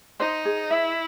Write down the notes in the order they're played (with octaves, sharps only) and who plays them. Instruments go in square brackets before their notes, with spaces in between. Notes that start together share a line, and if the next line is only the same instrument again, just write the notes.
[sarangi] D#4 [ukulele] C5
[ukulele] G#4
[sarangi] E4 [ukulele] E5